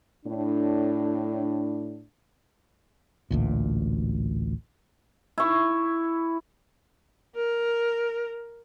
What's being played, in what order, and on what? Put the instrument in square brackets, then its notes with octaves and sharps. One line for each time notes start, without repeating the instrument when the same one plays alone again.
[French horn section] A2 D4
[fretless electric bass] A1 D2 A#2
[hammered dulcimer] E4 C#6
[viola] A#4